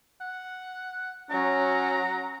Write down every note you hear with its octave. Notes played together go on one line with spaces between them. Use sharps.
F#5
F#3 C#4 A#5